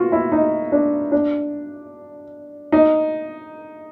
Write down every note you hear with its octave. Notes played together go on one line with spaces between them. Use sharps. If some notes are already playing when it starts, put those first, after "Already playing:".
Already playing: F4 F#4
E4
D#4
D4
D4
D#4